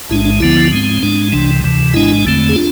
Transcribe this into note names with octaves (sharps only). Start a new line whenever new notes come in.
A1 G#2 G#3 D4 E4
D4
D2 D3 F3 B3 E4
G#2 G#3 C4
G#2 G#3 D4
C2 C3 E3 D4
D2 C3 E3
G#1 G#2 G#3 D4 E4
E2 D3 A3 C4
G#4
D4 F4